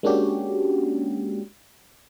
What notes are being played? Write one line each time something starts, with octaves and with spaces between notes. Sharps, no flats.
G#3 A#3 C#4 D4 F#4 G4